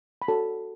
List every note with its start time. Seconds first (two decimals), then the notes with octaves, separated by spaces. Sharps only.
0.22 B5
0.28 F#4 A4 C#5 A5